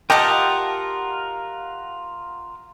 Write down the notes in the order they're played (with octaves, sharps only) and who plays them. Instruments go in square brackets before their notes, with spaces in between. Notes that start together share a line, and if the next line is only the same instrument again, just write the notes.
[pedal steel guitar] F4 A#4 F#5 [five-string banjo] G4 [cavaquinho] D#5 A5